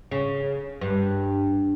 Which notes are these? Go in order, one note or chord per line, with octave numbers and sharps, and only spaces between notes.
C#3
G2